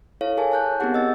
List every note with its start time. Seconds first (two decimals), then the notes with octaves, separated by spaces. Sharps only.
0.21 E4 A4 C#5 F5
0.37 G#4 A#4 G#5 A5
0.52 A5 F#6 G6
0.80 B3 C4 D#4 G4 G#4 F#5
0.94 D#5 E6 A6